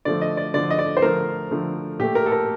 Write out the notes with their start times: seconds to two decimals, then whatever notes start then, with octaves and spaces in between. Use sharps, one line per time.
0.05 D3 F3 A3 D5
0.21 D#5
0.37 D5
0.54 D3 F3 A3 D5
0.70 D#5
0.79 D5
0.97 C5
1.02 D3 F3 A3 A#4
1.51 D3 F3 A3
1.99 A#2 A3 G4
2.15 A#4
2.26 A4
2.32 A#4